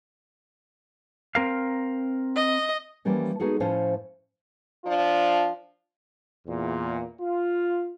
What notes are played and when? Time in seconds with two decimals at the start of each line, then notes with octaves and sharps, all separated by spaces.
1.35 C4 A#4 F5
2.36 D#5
3.05 E3 F3 G3 A#3 C#4
3.40 G#3 B3 D#4 F#4 G#4 A4
3.60 A2 F3 C#4 E4 C5 F5
4.84 F3 D4 F4
6.47 E2 A#2
7.20 F4